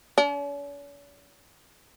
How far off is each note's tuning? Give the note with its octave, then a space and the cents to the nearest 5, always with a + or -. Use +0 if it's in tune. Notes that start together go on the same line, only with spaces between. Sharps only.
C#4 +45